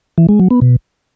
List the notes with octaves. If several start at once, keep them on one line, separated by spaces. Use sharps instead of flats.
E3
G#3
F#3
B3
B2